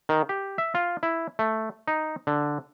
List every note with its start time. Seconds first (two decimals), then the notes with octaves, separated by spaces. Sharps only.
0.09 D#3
0.29 G4
0.58 E5
0.75 F4
1.03 E4
1.39 A3
1.88 D#4
2.27 D3